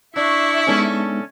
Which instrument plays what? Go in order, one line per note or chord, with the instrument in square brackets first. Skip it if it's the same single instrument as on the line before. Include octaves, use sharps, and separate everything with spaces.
[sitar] D4 [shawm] E4 [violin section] E5 C#6
[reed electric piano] G#3 B3 D#4 [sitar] C#4 A4